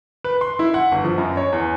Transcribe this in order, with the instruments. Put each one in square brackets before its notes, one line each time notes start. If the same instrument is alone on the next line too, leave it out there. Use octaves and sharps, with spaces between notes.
[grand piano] B4
C6
E4
F#5
G1
F3
F#2
C#5
E2